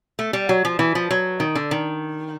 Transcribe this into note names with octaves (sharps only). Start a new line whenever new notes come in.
A3
G3
F#3
F3
E3
F3
F#3
D#3
D3
D#3